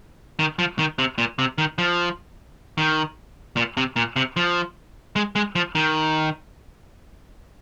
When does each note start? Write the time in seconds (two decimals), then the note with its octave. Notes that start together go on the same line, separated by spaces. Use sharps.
0.39 D#3
0.59 F3
0.79 D#3
0.99 C3
1.18 A#2
1.39 C3
1.58 D#3
1.78 F3
2.78 D#3
3.57 A#2
3.77 C3
3.96 A#2
4.16 C3
4.37 F3
5.16 G#3
5.36 G#3
5.56 F3
5.75 D#3